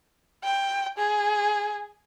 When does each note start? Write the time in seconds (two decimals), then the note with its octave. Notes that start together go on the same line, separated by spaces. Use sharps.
0.44 G5
0.98 G#4